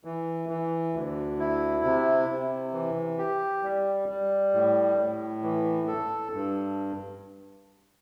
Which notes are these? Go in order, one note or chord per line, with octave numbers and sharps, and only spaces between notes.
E3
E3
D2
E4
C3
C3
E3
G4
G3
G3
A2
A2
E3
A4
G2